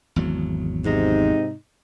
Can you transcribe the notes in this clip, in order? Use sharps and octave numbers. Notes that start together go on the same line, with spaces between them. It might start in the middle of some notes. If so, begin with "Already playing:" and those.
G#1 E2 F#3
G#2 C3 D#4